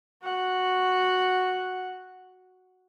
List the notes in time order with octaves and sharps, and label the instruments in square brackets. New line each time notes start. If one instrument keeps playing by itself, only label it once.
[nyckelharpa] F#4 F#5